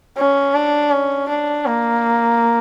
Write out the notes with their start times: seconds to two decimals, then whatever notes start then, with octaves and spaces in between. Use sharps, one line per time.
0.17 C#4
0.54 D4
0.92 C#4
1.28 D4
1.66 A#3